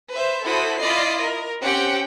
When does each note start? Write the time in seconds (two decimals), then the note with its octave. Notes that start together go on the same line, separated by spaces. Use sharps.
0.11 B4 C5 E5
0.45 E4 F#4 A4 C5 B5 D#6
0.80 E4 F4 D5 D#5 B5 C7
1.22 A#4
1.62 C4 C#4 G4 F#5 G5